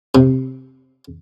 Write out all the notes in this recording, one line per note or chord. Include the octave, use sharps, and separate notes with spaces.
C3